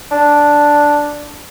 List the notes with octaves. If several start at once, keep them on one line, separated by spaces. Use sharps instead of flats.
D4